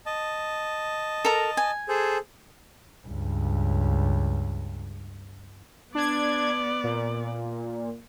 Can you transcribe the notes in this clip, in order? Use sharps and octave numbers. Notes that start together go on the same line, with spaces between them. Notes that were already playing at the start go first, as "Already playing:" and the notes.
D#5 A5
A4 A#4 A#5
G#5
G#4 A4 C5
C#2 G2
B3 D4 D5 G#6
A#2